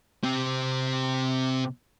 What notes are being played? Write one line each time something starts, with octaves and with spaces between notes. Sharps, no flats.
C3 C4